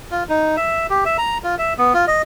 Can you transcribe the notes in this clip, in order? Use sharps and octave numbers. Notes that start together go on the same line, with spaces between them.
F4
D#4
E5
G4
E5
A#5
F4
E5
B3
F4
D#5